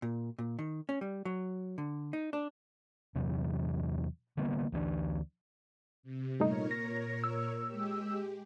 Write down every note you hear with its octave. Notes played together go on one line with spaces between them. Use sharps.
A#2
A#2
D#3
C#4
G3
F#3
D3
D#4
D4
E2 C3 E3 F#3
D3 G3 A#3 B3
D2 E3 A#3 D4
C3
G2 A#2 A3 D#4 A#4 C#5
A#6
E6
G#3 G4